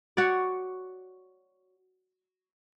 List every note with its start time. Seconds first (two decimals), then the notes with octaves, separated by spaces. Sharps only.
0.17 F#4 C#5 D5